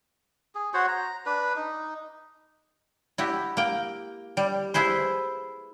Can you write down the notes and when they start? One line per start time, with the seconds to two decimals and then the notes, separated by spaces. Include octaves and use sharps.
0.55 G#4
0.74 F#4 C5 C#5 F#5
0.88 A#5
1.26 D4 B4
1.56 D#4
3.18 E4 F#4 G4
3.57 A#3 G5
4.37 G3
4.74 E4 G#4 B4 C5